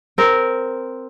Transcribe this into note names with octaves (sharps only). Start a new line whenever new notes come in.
C4 A#4